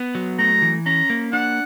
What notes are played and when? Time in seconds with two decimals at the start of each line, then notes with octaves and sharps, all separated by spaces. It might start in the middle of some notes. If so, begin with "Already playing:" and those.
Already playing: B3
0.15 F#3
0.39 A3 A#5
0.62 E3
0.86 C#4 A#5
1.10 A#3
1.33 D4 F#5